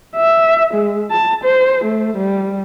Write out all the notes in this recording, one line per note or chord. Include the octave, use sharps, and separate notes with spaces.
E5
G#3
A5
C5
A3
G3